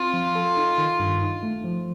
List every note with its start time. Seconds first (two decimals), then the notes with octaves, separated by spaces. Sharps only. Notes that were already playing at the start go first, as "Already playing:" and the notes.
Already playing: C4 F4
0.13 F3
0.35 A4
0.57 D#4
0.78 D#3
0.99 G2
1.22 D#4
1.43 A3
1.64 F3